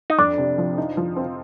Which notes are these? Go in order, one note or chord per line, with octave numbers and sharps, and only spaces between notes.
D#4
F2 D4
C3
F3
D#4
F3
C4